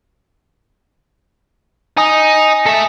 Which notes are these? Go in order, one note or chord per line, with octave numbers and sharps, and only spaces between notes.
D#4 G#5 D#6
A4 E5